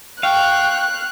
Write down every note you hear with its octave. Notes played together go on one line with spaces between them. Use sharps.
F5 G5 C#6 F#6